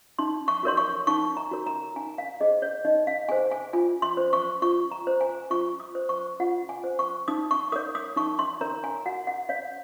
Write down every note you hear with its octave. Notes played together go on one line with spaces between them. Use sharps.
D#4 C6
C#6
F#4 A#4 C#5 C6
C#6
D#4 C#6
A#5
F#4 A#4 C#5
A#5
D#4 G#5
F5
G#4 C5 D#5
C#5
D#4 D#5
F5
G#4 C5 G#5
G#5
F4 G#5
C6
C5
C#6
F4 C#6
A#5
C5
G#5
F4 C#6
D#6
C5
C#6
F4 F#5
G#5
C5
C#6
D#4 D#6
C#6
A#4 C#5 D#6
D#6
D#4 C#6
C6
A#4 C#5 A#5
G#5
F#4 F#5
F#5
C#5 F5